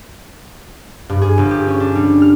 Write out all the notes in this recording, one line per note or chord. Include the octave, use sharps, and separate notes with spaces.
G2
G#4
G1
G4
C#4
D4
G3
F6